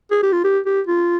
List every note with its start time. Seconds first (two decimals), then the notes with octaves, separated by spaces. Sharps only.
0.11 G#4
0.23 G4
0.33 F4
0.44 G4
0.66 G4
0.87 F4